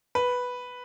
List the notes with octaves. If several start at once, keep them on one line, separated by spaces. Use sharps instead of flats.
B4